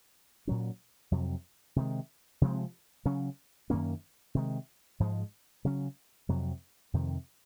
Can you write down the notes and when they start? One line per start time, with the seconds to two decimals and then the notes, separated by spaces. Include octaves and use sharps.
0.47 A#2 F#3 C#4
1.11 F2 C3 F#3
1.76 C3 D#3 G#3
2.41 C3 F3 G#3 C4
3.06 C#3 F#3 C#4
3.70 F#2 D#3 A#3 C#4
4.35 C3 D#3 G#3
5.00 G#2 F3 G#3
5.65 C#3 F#3 C#4
6.29 F2 C3 F#3
6.93 F2 C3 D#3